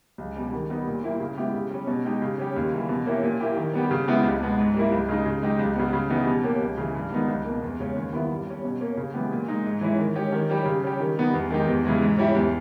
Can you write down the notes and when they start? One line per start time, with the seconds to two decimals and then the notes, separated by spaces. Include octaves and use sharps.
0.18 C#2
0.36 B2 G3
0.53 D#3
0.70 G3 B3 D#4
0.87 A#2
1.03 G3 A#3 E4 G4
1.20 C#3
1.37 G#3 B3 E4 G4
1.54 C#3
1.71 G3 C#4
1.87 B2
2.05 G#3 D#4 G4
2.22 C#3
2.38 G3 C#4 G4
2.56 D#2
2.73 C#3 E3 G3
2.89 B2
3.06 A#3 C#4 E4 G4
3.23 A#2
3.40 A#3 E4 G4
3.57 D#3
3.73 G3 B3 G4
3.91 C#3
4.08 G#3 B3 E4 G4
4.24 C#2
4.41 B2 G#3 B3
4.58 G#2
4.74 G3 A#3 E4
4.92 C#2
5.08 C#3 G#3 D#4
5.26 C#3
5.42 G#3 D#4 G4
5.59 C#2
5.76 C#3 G3 B3
5.93 C#3
6.10 E3 G3 B3 D#4
6.27 B2
6.43 A#3 C#4 G4
6.61 C#2
6.77 C#3 E3
6.95 G2
7.11 D#3 G#3 B3 D#4
7.28 C#2
7.45 B2 A#3
7.62 E2
7.79 C#3 G#3 C#4
7.95 D#2
8.13 D#3 G3 B3 E4
8.30 G2
8.46 G3 C#4
8.64 B2
8.81 A#3 C#4
8.97 C#3
9.14 E3 G#3 B3 G4
9.31 A#2
9.48 G#3 D#4
9.65 G#2
9.81 E3 G#3 C#4 E4
9.99 D#3
10.15 G#3 C#4 G4
10.32 D#3
10.49 G3 C#4 G4
10.65 C#3
10.83 G3 C#4 G4
11.00 D#3
11.17 G3 B3 D#4
11.34 E2
11.50 D#3 G#3 D#4 G4
11.67 E2
11.84 C#3 E3 G#3
12.02 G#2
12.18 G3 C#4 E4 G4
12.35 E2